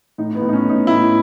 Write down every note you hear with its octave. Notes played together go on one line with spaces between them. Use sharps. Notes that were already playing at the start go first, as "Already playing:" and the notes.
A2 D#4
B3
A2
D#4
C#4
A2
D#4
A2 E4